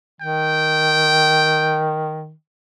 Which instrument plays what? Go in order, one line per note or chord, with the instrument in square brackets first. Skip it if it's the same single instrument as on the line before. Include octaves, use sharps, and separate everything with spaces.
[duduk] D#3 [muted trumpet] G5